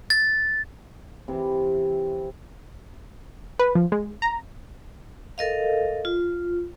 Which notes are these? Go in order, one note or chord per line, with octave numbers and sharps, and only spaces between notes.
A6
C3 E3
B4
F3
G#3
A#5
A4 A#4 D#5 F5
F4